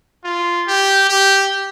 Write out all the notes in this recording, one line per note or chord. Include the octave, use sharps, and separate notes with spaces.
F4
G4
G4